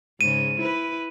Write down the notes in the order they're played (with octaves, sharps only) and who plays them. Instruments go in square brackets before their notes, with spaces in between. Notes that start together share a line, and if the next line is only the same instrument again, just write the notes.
[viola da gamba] G#2 C#3 [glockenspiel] D#7
[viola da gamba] E4 B4